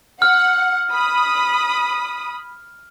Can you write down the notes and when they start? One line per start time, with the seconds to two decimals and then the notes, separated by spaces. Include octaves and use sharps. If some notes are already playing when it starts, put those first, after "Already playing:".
0.22 F#5 F6
0.92 B5 D#6